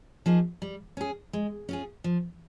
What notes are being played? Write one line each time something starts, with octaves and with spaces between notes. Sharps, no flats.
F3 A#3 D#4 G#4
G3
C#4 G#4
G#3
C#4 F4 G#4
F3